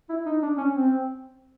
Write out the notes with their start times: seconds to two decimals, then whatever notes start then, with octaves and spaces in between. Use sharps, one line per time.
0.10 E4
0.26 D#4
0.43 D4
0.58 C#4
0.74 C4